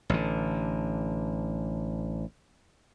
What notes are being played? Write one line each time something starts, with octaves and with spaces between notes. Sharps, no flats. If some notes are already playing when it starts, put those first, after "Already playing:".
A1 D3